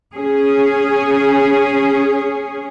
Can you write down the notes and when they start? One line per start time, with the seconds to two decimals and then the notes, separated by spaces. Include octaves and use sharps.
0.15 C#4 G#4